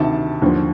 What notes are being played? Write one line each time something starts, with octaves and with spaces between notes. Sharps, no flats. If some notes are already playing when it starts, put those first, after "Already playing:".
Already playing: D2 C3 D#3 A5
D#2 D3 F3